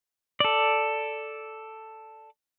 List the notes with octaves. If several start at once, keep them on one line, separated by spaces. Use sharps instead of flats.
A4 D5